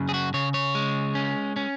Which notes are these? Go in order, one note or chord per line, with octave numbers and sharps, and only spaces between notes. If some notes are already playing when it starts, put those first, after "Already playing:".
Already playing: F#2 C#3
G#4
F#4
C#3 C#5
C#5
G#3
C#4
C#4